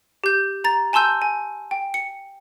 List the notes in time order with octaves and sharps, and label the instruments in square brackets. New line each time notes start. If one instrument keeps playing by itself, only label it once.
[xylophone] G4 G6
A#5 A6
G#5 A5 C6 E6 G6
G#5
G5
C#7